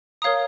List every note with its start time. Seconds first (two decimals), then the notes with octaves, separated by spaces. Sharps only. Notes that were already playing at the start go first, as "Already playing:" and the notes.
0.22 A#4 C#5 F5 A#5 D#6